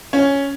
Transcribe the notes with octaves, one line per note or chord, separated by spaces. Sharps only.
C#4